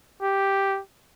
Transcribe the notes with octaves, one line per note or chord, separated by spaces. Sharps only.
G4